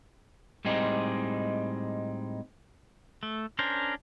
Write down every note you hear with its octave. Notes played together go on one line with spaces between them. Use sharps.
A2 G3 G#3 C4 D#4
A3
C#4 D4 A#4 C5